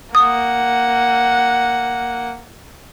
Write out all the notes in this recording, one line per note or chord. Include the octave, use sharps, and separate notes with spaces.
A#3 F#5 D#6